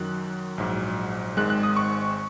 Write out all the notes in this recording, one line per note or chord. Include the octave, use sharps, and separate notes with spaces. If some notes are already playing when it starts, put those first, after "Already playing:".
Already playing: F#2 D#3 F#3 F#6
A#1 G#2 F#3
G#1 G#2 D#3 G#3 F#6
F#6
D#6
C#6